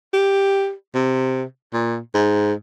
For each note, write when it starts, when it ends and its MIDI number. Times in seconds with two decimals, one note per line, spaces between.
0.13 0.73 67
0.95 1.43 48
1.73 1.98 46
2.14 2.53 44